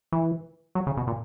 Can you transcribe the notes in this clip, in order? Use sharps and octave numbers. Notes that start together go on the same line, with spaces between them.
E3
F#3
C#3
B2
A#2